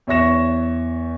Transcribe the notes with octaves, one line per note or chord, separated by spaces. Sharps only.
E2 C#5 E5 C#6 A#6 E7